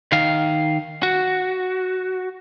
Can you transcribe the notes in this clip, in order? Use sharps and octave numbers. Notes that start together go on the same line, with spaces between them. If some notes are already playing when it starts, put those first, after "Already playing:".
D#3 F5
F#4